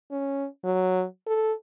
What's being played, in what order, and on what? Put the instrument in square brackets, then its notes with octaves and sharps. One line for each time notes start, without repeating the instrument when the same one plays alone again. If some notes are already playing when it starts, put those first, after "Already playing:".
[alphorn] C#4
F#3
A4